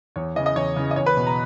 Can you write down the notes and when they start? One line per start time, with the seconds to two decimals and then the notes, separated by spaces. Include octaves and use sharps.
0.16 E2 C#5
0.36 C#3 E3 D#5
0.46 D#5
0.56 E2 C#5
0.76 C#3 E3
0.91 D#5
0.96 E2 C#5
1.06 B4
1.17 B2
1.27 A#5